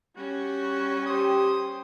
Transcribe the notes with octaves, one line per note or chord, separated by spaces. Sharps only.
G3 C#4 F#4
G4 C5 G5 D#6